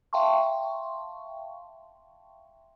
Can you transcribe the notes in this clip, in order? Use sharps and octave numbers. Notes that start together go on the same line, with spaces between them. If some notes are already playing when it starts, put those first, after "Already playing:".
E5 F5 G5 A5 C6 C#6